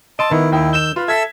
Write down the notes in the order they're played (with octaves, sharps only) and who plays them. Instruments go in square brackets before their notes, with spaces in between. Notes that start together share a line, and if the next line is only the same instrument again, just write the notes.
[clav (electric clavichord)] D#5 [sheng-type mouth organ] A5 [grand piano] C6 E6 D7
[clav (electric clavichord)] D#3 [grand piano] B3 [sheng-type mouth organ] E4
[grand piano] D#2 G5 [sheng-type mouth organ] E4
[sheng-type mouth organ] E6 G6 [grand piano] E7 G7
[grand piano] F4 [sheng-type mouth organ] B4
[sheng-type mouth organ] A4 E5 E6 [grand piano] G#6 B6